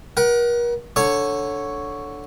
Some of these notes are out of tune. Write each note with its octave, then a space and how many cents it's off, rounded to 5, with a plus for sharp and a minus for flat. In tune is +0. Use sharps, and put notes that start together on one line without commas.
A#4 +40 F#5 +25
D3 +0 C#5 +0 C#6 +0